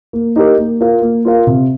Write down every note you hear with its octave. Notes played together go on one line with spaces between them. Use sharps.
A#3
D#4 G4 A#4
A#3
F4 A#4 F5
A#3
F4 A#4 F5
C3